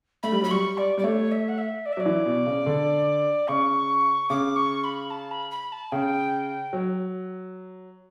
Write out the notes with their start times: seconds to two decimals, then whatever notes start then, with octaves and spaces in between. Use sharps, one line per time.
0.23 A3 B5
0.32 G3
0.42 F#3 B5
0.51 G3 C#6
0.78 D5
0.98 G3 D5
1.04 A3 C#5
1.32 E5
1.48 F#5
1.58 E5
1.86 D5
1.92 E5
1.97 F#3 D5
2.06 E3
2.26 B2
2.46 C#3
2.66 D3
3.48 C#3 C#6
4.29 C#3 D6
4.56 C#6
4.84 B5
5.11 A5
5.31 B5
5.51 B5
5.72 A5
5.92 C#3 G5
6.73 F#3